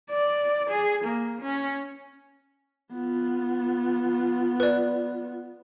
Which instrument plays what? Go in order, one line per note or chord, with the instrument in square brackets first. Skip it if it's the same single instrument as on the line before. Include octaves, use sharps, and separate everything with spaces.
[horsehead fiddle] D5
G#4
A#3
C#4
B3 F4
[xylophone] B4 D5